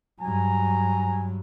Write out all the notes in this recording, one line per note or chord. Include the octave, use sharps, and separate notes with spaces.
G2 F#3 G#5 A#5